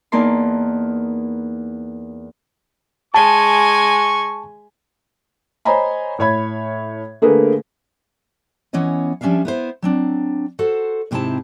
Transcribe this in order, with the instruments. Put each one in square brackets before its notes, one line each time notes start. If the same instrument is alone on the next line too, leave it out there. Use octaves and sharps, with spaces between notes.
[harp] E2 A#3 D#4 A#4 A5 C6
[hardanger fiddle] G#3 G#5 [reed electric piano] A5 [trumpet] C#6
[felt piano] C5 C#5 D#5 G#5 A#5 B5
A2 C#5 B5 G#6
D3 A3 A#3 G#4 A#4 B4
[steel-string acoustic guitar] E3 B3 C#4 C#5 D#5
F3 G3 C#4 D4 E5 F5
B3 E4 C5
F#3 C4 D4
F#4 A4 C5 F#5
G#2 C3 C4 D#4 E4 A5